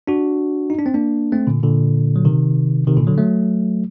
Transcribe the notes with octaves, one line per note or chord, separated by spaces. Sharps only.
D4 F#4
D#4
D4
C4
A#3 D4
A3 C4
A#2 D3
A#2 D3
F#3
C3 D#3
C3 D#3
A#2 D3
D3 F#3
F#3 A3